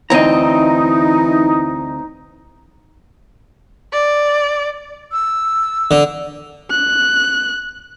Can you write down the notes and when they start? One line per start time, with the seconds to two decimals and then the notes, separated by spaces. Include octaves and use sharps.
0.10 D2 E3 C4 D#4 D#5 A#5
3.92 D5
5.11 E6
5.91 D3
6.70 F#6